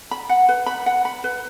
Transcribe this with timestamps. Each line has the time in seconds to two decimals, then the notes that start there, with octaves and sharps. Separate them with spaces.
0.11 B5
0.29 F#5
0.49 B4
0.66 B5
0.86 F#5
1.05 B5
1.24 B4